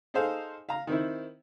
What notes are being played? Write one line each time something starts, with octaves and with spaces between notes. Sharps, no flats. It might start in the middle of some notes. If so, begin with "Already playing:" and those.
D#4 G#4 A4 C5 F5
F5 A#5
D#3 C4 E4